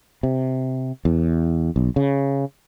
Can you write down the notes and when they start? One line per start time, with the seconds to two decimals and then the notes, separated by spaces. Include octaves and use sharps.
0.23 C3
1.05 E2
1.76 B1
1.96 C#3